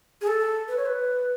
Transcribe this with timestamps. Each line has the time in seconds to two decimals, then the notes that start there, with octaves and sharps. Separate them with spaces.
0.21 G#4
0.27 A4
0.68 B4
0.77 C#5
0.86 B4